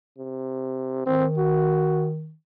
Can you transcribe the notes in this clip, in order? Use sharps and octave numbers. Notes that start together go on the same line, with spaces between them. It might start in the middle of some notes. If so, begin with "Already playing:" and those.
C3
D#3 C4
F#4